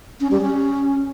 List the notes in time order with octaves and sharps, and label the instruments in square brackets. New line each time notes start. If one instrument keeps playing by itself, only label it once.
[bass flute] C#4
G3
C#4